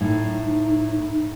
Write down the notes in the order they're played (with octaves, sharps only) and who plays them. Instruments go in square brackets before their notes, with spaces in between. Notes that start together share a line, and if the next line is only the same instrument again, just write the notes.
[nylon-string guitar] A2 [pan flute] D#4